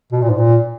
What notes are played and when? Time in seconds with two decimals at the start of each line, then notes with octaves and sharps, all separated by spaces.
0.13 B2
0.22 A#2
0.30 G#2
0.38 A#2